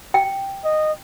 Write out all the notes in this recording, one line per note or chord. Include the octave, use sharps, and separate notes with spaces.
G5
D#5